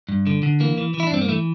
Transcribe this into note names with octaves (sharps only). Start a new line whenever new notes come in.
G2
D3
D3
E3 A#3
E3
E3
E4
D4
G2 C4
A#3
E3 A3